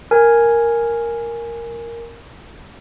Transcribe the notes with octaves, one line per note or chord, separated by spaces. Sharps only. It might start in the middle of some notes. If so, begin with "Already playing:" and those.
A#4 G#5